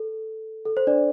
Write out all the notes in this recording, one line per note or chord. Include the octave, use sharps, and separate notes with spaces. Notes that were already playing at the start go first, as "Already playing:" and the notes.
Already playing: A4
A4
C5
D4 D5